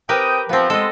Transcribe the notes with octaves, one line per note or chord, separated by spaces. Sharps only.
C4 G4 A#4 B4 G5 D#6
F3 B3 C4
G#3 A4 D#5